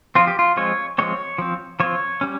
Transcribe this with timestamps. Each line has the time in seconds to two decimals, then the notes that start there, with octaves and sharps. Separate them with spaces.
0.15 F3 C4 F4
0.27 G4
0.39 F4
0.57 F3 G#3 C4 C#5
0.98 F3 G#3 C4 C#5
1.38 F3 C4
1.80 F3 C4 C#5
2.21 G3 C#4